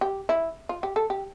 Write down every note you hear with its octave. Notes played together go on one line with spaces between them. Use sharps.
G4
E4
F4
G4
A4
G4